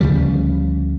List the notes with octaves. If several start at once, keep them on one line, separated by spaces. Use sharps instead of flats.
D2 C#3 F3 G3